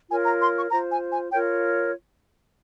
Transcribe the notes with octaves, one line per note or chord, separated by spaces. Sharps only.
F4 A#4 C#5 G#5
A#5
C6
C#6
F4 C5 A#5
G#5
G#5
F4 A#4 C#5 G5